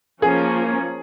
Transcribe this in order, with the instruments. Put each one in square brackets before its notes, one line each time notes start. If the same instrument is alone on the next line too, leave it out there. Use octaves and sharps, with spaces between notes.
[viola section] F3 A#3 C#4 [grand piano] G#4